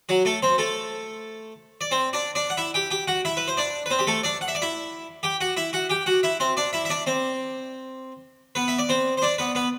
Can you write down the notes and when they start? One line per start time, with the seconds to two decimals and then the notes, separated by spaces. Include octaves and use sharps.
0.09 F#3 F#4
0.25 A3 A4
0.43 C4 C5
0.58 A3 A4
1.81 D5
1.91 C4 C5
2.13 D4 D5
2.35 D4 D5
2.50 F#5
2.57 E4 E5
2.74 G4 G5
2.91 G4 G5
3.08 F#4 F#5
3.25 E4 E5
3.37 B4
3.48 C5
3.57 D4 D5
3.86 B4
3.90 C4 C5
3.99 G4
4.07 A3 A4
4.23 D4 D5
4.41 F#5
4.48 E5
4.55 D5
4.62 E4 E5
5.23 G4 G5
5.41 F#4 F#5
5.57 E4 E5
5.73 F#4 F#5
5.90 G4 G5
6.06 F#4 F#5
6.23 E4 E5
6.40 C4 C5
6.57 D4 D5
6.73 E4 E5
6.85 E5
6.90 D4 D5
7.06 C4 C5
8.55 B3 B4
8.68 E5
8.78 D5
8.89 C4 C5
9.17 C5
9.22 D4 D5
9.38 B3 B4
9.55 B3 B4